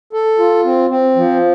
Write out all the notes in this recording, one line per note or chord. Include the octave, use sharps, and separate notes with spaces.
A4
F4
C4
C4
F3